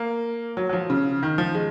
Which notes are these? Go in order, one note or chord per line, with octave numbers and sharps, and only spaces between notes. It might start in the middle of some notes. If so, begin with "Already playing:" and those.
Already playing: A#3
F#3
F#3
F3
C#3
D#3
F3
G#3